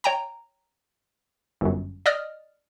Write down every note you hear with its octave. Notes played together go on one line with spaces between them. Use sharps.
C#5 G5 A#5
G1 F#2
D5 D#5 D#6 F6